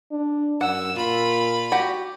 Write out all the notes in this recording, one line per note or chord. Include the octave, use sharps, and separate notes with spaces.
D4
F#2 F#5 E6
A#2 F4 B5
F#4 G4